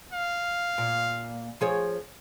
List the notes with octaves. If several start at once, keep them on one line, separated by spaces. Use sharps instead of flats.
F5
A#2
F3 G#4 C#5